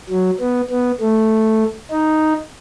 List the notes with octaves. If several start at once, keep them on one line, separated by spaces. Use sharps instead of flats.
F#3
B3
B3
A3
D#4